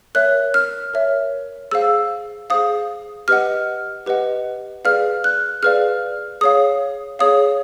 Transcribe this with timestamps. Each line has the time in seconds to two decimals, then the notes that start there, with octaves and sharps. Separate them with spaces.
0.15 A#4 C#5 E5 F#6
0.54 F6
0.94 A#4 C#5 E5
1.71 G#4 C5 F5 E6
2.50 G#4 C5 F5 D#6
3.28 G4 B4 D#5 F#5 F6
4.06 G4 B4 D#5 F#5
4.85 G#4 B4 D5 F5 F6
5.24 F#6
5.63 G#4 B4 D5 F5 F6
6.41 G#4 C#5 F5 D#6
7.19 G#4 C#5 F5 D#6